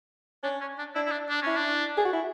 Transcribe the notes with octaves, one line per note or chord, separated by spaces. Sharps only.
C#4 D4
C#4
D4
D4 E4
E4
D4
D4
C#4 E4
D4
G#4
F#4
E4